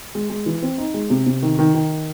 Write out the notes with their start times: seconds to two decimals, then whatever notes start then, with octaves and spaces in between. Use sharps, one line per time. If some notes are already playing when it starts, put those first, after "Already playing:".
0.15 G#3
0.30 G#3
0.46 E3
0.63 C4
0.78 D#4
0.94 G#3
1.10 C3
1.26 C3
1.42 D#3
1.59 D#3
1.74 D#3